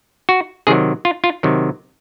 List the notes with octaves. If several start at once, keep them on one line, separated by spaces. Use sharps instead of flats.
F#4
C3 D#3 F#3 G#4
F4
F4
C3 D#3 F#3